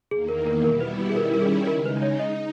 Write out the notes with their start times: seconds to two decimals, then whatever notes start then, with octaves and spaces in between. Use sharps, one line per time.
0.11 E2 D#3 A#3 G#4
0.28 A#4
0.47 A#4
0.64 B2 G3 B3 E4 A#4
0.81 B4
1.09 G#4
1.15 D#3 G3 C#4 E4 A#4
1.34 A#4
1.41 G#4
1.67 C#3 G#3 D#4 A#4
1.86 B4
2.02 C#5
2.19 D#4 D#5